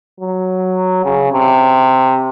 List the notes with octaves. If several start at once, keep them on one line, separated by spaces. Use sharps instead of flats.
F#3
C#3
C3